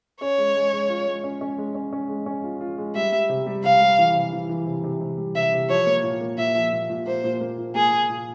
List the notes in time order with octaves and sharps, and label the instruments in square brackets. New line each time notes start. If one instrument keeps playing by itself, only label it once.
[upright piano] C#4 [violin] C#5
[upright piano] G#3
G#3
G#3
F4
G#3
C#4
C#4
G#3
C#4
C#4
G#3
C#4
F4
F4
G#3
[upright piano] G3 [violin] E5
[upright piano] G3
C3
G3
[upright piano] C3 [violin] F5
[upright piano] G3
E3
C3
E3
E3
C3
C3
C3
G3
[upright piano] C3 [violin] E5
[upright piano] C3
[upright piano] F3 [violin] C#5
[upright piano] A#3
A#2
A#3
[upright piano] A#2 [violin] E5
[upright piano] F3
A#2
A#2
[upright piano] A#3 [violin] C5
[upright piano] A#2
A#3
A#2
[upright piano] A#3 [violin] G#4
[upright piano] A#2
A#2